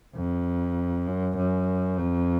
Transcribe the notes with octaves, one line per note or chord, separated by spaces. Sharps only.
F2
F#2
F#2
F2